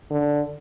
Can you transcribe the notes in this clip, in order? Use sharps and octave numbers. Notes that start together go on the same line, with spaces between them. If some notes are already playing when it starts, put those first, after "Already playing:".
D3